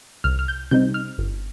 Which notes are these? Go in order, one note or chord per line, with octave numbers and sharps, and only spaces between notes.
C2 F6
F6
G6
C3 G3 C4 D#4 G6
F6
G1